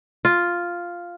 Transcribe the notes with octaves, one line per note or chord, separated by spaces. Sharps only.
F4